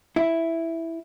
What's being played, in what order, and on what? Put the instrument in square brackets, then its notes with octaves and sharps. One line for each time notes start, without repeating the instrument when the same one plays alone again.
[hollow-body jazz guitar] E4